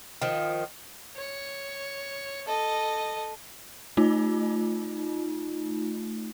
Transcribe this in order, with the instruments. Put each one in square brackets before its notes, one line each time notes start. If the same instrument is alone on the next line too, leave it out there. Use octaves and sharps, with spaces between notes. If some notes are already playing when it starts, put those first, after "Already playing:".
[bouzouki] D#3 F3
[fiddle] C#5
A4 D#5
[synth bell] A3 D#4 F4